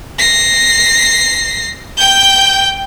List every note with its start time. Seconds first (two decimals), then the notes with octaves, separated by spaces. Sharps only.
0.19 A#6 C7
1.97 G5 G6